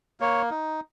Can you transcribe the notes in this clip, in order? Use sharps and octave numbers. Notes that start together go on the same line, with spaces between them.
A#3 C#5
D#4